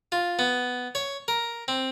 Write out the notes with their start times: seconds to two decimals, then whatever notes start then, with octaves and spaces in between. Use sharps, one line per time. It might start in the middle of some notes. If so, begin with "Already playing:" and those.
0.12 F4
0.39 B3
0.95 C#5
1.28 A#4
1.68 C4